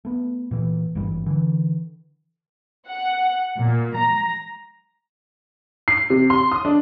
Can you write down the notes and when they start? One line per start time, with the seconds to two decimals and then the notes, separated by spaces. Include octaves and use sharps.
0.05 A3 B3
0.51 A#2 E3
0.95 G#1 G2 E3 G3
1.26 D3 E3
2.88 F#5
3.58 A#2
3.96 A#5
5.88 C7
6.10 C3
6.30 C6
6.51 D#6
6.65 D4